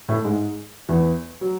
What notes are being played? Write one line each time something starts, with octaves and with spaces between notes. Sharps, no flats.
A2 A3
G#2 G#3
E2 E3
F#3